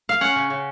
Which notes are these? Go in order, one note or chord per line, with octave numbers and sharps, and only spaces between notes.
F5
C#4 F#5
C#3
C#3